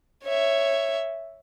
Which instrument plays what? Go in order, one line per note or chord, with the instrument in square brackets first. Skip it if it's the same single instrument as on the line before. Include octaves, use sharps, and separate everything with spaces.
[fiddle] C#5 E5